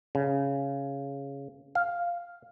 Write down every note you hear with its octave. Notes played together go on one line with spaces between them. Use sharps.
C#3
F5